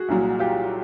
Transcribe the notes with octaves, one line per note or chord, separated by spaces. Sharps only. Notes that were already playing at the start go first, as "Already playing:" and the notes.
Already playing: F#4 G#4
C2 A#2 F#3
F4 G4